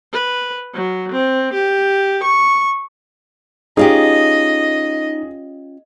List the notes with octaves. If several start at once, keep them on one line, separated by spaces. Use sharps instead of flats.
B4
F#3
C4
G4
C#6
C#4 D#4 F4 G4 G#4 D#5